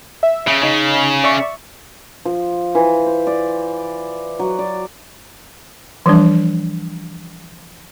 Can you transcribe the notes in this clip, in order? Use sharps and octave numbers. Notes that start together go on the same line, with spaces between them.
E5
C#3
C#3 D#4
D5 E5 C#6
F3
E3
C5
D5
F#3
D5
E3 F3 G3 D4